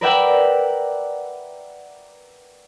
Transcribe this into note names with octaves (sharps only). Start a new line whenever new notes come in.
A#4 B4 D5 E5 F#5 G5